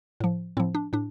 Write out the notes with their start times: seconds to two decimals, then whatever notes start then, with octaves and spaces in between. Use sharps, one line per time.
0.20 A2 F3
0.57 A2 F3 C4 E4
0.75 D4
0.93 A2 D4